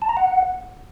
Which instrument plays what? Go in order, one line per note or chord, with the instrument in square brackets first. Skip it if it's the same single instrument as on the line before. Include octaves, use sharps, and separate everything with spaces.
[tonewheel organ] A5
A#5
F#5